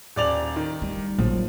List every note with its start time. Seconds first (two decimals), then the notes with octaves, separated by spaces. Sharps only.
0.16 D#1 D5 F7
0.56 D#3
0.82 G3
1.18 A#1 F3 F#3